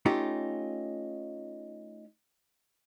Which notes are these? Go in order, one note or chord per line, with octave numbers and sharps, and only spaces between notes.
A3 C#4 D#4 F4 G4